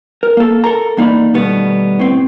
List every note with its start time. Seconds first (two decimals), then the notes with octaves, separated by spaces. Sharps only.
0.23 A#4
0.37 A#3 A4
0.64 A4 A#4 A#5
0.97 E2 A#3 D#4 D5 B5
1.34 B2 D#3 G3 A3 B3
1.99 A2 C4